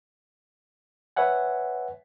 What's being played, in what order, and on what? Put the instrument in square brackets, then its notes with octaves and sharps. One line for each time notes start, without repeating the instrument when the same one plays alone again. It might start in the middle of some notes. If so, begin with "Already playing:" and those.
[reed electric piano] B4 C#5 E5 F#5 G#5